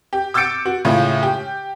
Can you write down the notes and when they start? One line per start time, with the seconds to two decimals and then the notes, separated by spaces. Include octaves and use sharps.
0.13 G4
0.34 D6 E6 G6 A6 C#7 D7
0.66 F#4
0.85 A2 C#3 G#3 F4
1.23 G4